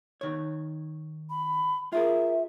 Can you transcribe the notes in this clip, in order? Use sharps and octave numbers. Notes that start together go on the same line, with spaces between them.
D#3 C#5
B5
F4 G#4 A#4 E5